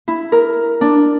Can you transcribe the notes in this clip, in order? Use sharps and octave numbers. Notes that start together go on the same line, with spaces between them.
E4
A#4
D4